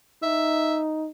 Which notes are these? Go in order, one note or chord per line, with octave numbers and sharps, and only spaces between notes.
D#4 E5